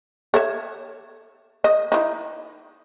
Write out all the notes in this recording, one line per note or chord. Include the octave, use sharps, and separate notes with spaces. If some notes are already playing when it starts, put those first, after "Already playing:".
A4 C#5 E5
D#5
D#4 E4